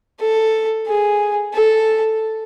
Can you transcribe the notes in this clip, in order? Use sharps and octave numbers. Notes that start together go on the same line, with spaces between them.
A4
G#4
A4